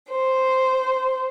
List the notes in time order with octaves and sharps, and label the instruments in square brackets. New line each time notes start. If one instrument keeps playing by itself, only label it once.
[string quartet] C5